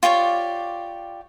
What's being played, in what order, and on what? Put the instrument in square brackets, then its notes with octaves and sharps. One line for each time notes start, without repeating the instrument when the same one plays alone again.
[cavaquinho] F4 G4 C#5 D5